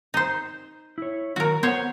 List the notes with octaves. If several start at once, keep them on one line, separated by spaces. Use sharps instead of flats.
D#4 C5
E4 C#5
D#3 F#3 F#4 A#4
B3 C5 C#5 F#5